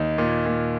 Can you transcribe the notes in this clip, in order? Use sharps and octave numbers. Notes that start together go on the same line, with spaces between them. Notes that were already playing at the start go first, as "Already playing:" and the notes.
Already playing: D#2 D#4
A#2
A#2